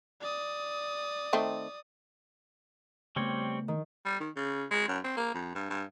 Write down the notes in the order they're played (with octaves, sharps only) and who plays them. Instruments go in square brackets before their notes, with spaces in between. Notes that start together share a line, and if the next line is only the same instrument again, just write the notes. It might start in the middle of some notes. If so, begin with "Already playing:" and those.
[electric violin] D5 D#6
[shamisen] D#3 A3 C4
[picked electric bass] C#3 A3 B3 [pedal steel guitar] G3 C4 C#5
[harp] D#3
[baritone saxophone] G3
D#3
C#3
G#3
F#2
C4
A#3
F2
G2
G2